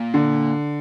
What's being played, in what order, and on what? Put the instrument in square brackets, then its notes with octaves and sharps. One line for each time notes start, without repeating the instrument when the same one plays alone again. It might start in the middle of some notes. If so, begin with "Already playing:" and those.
Already playing: [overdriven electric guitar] A#2
[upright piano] D3